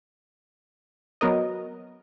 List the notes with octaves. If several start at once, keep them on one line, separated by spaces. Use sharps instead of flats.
F#3 B3 A#4 D#5